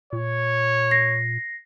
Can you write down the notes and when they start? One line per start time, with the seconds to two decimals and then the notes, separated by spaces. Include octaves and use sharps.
0.13 A#2 C#5
0.91 A#6 C7